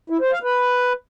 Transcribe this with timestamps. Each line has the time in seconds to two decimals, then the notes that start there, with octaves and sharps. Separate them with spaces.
0.10 E4
0.21 C5
0.32 F5
0.43 B4